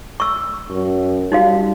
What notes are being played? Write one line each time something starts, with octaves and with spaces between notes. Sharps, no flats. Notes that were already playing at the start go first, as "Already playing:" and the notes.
C#6 E6
F#2
G3 D#4 F#4 F5